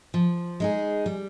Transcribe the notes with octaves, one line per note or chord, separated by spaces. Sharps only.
F3
G#3 D#4 G#4
G3